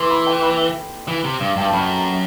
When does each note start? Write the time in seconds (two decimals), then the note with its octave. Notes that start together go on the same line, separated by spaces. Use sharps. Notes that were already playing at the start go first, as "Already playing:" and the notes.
Already playing: E3 C6 D6
0.11 B5
0.27 G5
0.43 B5
1.08 E3
1.24 C3
1.40 G2
1.56 G2 G5
1.65 A5
1.73 F#2 B5